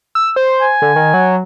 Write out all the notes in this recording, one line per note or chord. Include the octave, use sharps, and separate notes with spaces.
E6
C5
G#5
D3
D#3
F#3